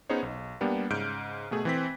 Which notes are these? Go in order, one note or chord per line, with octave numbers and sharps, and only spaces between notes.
B3 C#4 D#4 G#4 C5 C#5
B1
G3 A#3 B3 D4 G4
G#2 C#3 F6 G6 D7
B2 A3 G#4
E3 C4 B6